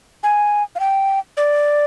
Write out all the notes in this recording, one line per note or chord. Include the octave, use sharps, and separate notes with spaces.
G#5
F5
G5
D5